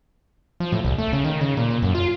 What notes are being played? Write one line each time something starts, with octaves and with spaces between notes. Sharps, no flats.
F3
A2
C2
A3
C#3
D#3
C#3
A#2
A#2
F#2
F4